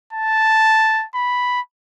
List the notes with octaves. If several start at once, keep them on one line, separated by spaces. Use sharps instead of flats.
A5
B5